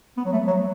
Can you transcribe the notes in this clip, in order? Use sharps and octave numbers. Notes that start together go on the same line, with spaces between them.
B3
F#3
A3
F#3